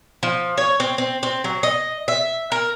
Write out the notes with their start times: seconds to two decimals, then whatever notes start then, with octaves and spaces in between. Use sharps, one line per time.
0.23 F3
0.57 C#5
0.80 C4
0.98 C4
1.23 C4
1.44 F#3
1.63 D#5
2.08 E5
2.52 A#4